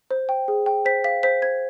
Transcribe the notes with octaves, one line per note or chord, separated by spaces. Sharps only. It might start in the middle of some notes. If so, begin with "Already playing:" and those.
C5
G5
G#4
G5
C5 B6
F5 B6
C5 B6
C5 G#6